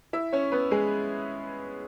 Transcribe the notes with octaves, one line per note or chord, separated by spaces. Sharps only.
E4 E5
C#4 C#5
B3 B4
G#3 G#4